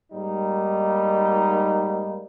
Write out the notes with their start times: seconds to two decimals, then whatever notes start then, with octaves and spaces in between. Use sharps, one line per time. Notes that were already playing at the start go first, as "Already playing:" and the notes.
0.12 G#2 G3 A#3 D#4